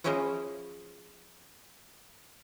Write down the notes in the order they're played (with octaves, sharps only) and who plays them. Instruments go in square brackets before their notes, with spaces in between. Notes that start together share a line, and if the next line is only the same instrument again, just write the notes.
[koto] F3 C#4 E4 G#4 C5 D#5